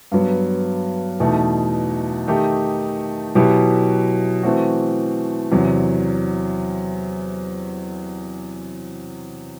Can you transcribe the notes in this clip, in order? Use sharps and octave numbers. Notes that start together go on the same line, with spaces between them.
G2 F#3 B3
E2 B2 A3 D#4
D#3 A3 D#4 G4
B2 F#3 B3 E4 G4
E3 A3 C4 F#4
E2 C3 F#3 C4